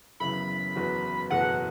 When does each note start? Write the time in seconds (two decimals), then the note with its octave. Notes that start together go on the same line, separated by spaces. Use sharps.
0.20 F#1 F#2 C#3 E3 B3 B5
0.75 F#1 E2 E3 B3 F#4
1.30 F#1 E2 B2 A3 F#4 F#5